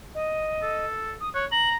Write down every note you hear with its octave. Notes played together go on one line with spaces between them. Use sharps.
D#5
A4
D#6
C#5 F#6
A#5 F#7